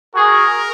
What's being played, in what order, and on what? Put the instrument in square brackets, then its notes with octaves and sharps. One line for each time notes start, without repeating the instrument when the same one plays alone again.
[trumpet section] F#4 G#4 [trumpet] A#4